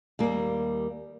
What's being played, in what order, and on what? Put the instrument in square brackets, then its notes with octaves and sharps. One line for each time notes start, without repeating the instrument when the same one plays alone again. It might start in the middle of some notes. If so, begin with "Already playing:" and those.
[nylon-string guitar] D#2 G3 A#3